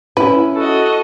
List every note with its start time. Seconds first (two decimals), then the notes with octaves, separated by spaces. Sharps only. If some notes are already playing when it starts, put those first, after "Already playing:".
0.17 C#4 E4 B4
0.56 F#4 A4 D#5